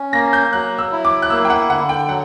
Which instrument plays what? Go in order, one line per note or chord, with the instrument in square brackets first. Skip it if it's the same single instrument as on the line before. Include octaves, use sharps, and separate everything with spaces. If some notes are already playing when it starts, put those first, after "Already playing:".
Already playing: [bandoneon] C#4
[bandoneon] A#3 [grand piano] A#6
[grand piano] G6
[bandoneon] F#3 [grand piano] F#6
[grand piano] E6
[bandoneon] E4
[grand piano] D6
F#6
[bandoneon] A#3 [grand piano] E6
[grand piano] G5
F#5
[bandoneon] D3 [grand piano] F#5
[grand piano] G5
[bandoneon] F#3 [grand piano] F#5